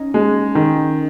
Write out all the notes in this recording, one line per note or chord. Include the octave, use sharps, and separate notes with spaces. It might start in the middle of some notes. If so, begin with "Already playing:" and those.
Already playing: C#4 D#4
G#3
D#3